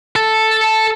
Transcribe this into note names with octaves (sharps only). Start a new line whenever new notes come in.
A4 A5